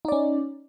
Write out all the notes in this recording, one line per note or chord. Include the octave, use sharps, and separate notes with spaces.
C#4 D#4 D5